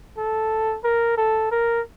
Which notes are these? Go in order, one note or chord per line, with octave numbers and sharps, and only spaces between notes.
A4
A#4
A4
A#4